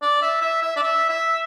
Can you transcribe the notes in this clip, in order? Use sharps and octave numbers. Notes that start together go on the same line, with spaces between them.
D5
E5
E5
E5
D5
E5
E5